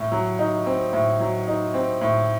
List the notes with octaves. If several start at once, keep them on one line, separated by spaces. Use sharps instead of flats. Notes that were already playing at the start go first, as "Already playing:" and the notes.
Already playing: A2
F#3
D#4
C4
A2
F#3
D#4
C4
A2